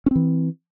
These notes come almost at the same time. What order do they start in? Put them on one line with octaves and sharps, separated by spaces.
C#4 C4 E3